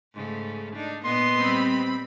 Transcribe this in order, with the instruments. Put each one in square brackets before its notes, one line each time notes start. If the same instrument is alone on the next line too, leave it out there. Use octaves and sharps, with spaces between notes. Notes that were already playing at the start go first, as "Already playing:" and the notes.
[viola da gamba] G#2 C#3 A3
D4 D#4
[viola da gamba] A#2 B3 D#5 [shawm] C6
[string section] G3 C4 B5